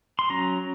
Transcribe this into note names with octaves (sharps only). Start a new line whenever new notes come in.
C6
F#3 C#4 A#5